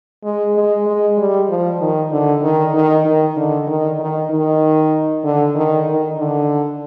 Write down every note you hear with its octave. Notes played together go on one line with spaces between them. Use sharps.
G#3
G#3
G#3
G3
F3
D#3
D3
D#3
D#3
D#3
D3
D#3
D#3
D#3
D3
D#3
D#3
D3